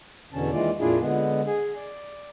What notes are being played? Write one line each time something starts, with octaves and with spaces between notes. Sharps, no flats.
E2 B2 D3 C#4 A5
D#3 E3 G#3 A#3 F4 D5
F2 A#2 D4 E4 F4 G#4
D3 G#3 B3
G#4
D5